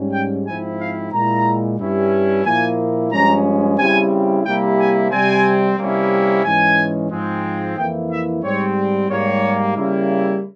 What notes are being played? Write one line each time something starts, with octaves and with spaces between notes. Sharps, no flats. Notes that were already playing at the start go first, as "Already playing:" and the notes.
Already playing: G#2 G3 C#4
G5
G#2 F3 C4 E4 G#5
F5
A#2 G#3 E4 A#5
G2 G3 C#4 E4
A#2 F3 A#3 E4 G#5
G2 F3 G#3 C#4 A#5
C#3 G3 C4 E4 G#5
C3 G3 A#3 E4 G5
G#5
C3 G3 C4 G#5
C3 G3 A#3 C#4 E4
G#2 E3 G#3 C#4 G#5
G#2 F3 G#3 C4
F2 E3 A#3 E4 G5
E5
G#2 G3 C4 C#5
G#2 G3 A#3 C#5
C#3 G3 A#3 E4